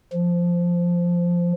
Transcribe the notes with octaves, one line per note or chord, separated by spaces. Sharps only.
F3